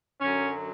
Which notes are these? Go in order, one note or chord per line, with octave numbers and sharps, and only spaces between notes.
F#2 D3 F#3 C#4